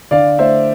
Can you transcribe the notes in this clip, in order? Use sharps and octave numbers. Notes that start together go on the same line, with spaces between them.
D3 D5 F5
A3 C5 E5